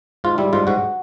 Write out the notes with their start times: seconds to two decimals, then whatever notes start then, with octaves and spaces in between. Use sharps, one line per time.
0.24 G#2 F4
0.38 G3 E4
0.53 G#2 F4
0.67 G#2 F#4